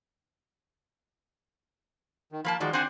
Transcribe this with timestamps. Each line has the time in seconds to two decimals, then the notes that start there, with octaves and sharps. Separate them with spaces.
2.32 D#3
2.45 F3 A#3 A5 B5
2.60 D#3 F3 G#3 F#4 D5
2.73 C4 D4 C5 F#5 G#5